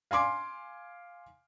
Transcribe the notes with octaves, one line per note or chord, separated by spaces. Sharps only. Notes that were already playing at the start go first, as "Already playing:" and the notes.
F5 G#5 C6 D6